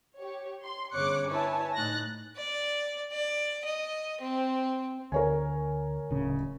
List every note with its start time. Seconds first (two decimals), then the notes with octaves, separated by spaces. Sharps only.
0.18 G4 C#5
0.63 C6
0.93 G1 C#3 C#5 D6 F#6 C#7
1.30 E4 B4 C#5 G#5 A5
1.75 A2 D#4 F#6 A6 A#6
2.36 D5
3.12 D5
3.65 D#5
4.21 C4
5.12 D2 A#4 C#5 G#5
6.10 D1 C#3